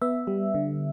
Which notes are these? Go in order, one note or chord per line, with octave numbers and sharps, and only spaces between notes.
B3 E5
G3
D3